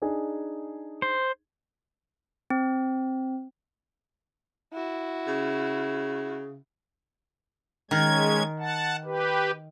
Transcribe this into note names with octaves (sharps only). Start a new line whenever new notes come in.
D4 D#4 G#4
C5
C4
E4 F#4
C#3
D#3 G#3 C#4 A#4 G#6
F#5 A5
G4 B4